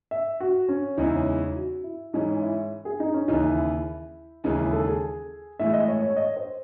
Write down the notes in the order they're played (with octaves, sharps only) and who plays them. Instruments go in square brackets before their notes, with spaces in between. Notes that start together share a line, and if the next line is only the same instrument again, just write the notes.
[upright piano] E5
F#4
C#4
[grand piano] E2 C#3 G#3 C#4 E4 [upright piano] D#4
[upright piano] E4
F#4
E4
[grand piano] G#2 E3 G#3 C#4 [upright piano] D#4
[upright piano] E4
G#4
D#4
C#4
[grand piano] D#2 C#3 E3 [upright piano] D#4
[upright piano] E4
E4
E4
[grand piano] D#2 C#3 E3 G#3 [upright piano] D#4
[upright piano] E4
A4
G#4
[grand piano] A2 E3 G#3 [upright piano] E5
[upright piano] D#5
C#5
C#5
D#5
C5